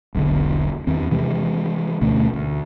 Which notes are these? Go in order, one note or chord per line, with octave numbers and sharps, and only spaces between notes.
E1 B1 B2 D3
E2 D#3 E3 C4
C3 E3 G#3
D2 B2 A3 C#4
D2